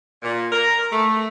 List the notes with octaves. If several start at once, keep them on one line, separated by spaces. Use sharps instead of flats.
A#2
A#4
A3